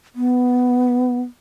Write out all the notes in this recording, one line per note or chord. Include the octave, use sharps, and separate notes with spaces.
B3